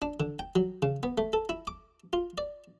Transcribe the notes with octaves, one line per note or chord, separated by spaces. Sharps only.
D4
D3
G5
F#3
C#3
B3
A3
A4
E4
D6
F4
D5